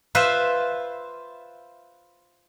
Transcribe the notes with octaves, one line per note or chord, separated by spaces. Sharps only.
F4 B4 C5 E5